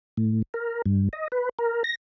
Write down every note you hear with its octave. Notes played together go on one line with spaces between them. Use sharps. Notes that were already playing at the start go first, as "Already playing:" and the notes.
A2
A#4
G2
D#5
B4
A#4
A#6